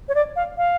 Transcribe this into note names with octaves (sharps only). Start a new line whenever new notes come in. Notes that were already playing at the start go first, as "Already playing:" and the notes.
C#5
D5
F5
F5